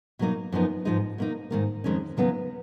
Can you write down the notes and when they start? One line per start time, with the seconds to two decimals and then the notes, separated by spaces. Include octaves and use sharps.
0.19 B2 F#3 A#3 D#4
0.52 F#2 F3 B3 D#4
0.85 G#2 F3 G#3 D#4
1.18 B2 A#3 D#4
1.51 G#2 D#3 A#3
1.84 F2 D#3 G#3 C#4
2.17 D#2 C#3 F#3 B3 D#4